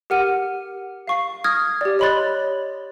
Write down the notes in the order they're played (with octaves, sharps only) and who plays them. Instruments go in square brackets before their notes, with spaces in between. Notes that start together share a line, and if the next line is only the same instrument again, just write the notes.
[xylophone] G4 A#4 F#5 F6 D#7
F5 C#6 C7
D#6 F6 G#6 A#6
G4 D5
C#5 D#5 B5 C6 F#6 A6